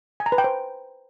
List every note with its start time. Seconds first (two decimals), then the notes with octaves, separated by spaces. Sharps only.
0.20 G#5
0.26 A#5
0.32 B4
0.38 G5
0.44 C5